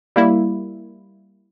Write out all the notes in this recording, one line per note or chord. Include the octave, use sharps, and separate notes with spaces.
G3 A#3 E4